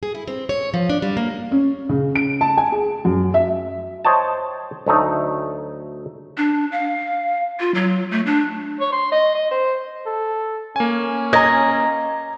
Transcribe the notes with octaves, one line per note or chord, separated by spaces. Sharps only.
G#4
E4
C4
C#5
F3
D4
G3
A#3
C#4
C#3
D7
A5
G#5
G#4
F#2
E5
C5 C#5 D#5 G5 A5
D2 F#3 A3 D#4
D4
F5
F4
F#3
A3
D4
C#5
C6
D#5
D#5
C5
A4
A#3 C#4 G#5
D#5 A#5 G#6